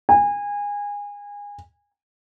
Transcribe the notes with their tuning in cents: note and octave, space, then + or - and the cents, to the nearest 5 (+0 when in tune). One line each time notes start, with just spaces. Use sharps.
G#5 -25